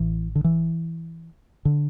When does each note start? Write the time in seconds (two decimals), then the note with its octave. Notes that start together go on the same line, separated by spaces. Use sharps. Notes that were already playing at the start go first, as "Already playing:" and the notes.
Already playing: A1 A2 E3
0.35 D3
0.44 E3
1.65 D3